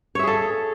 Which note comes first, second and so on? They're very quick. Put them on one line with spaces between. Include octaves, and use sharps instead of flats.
C#5 E5 G#4 A4